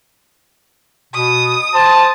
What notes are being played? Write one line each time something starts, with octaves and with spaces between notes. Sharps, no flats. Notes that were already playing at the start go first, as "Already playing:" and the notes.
B2 D#6
C5 A5